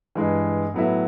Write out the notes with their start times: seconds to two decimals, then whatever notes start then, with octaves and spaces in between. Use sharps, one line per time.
0.15 G2 E3 G#3
0.74 A2 F#3 B3 E4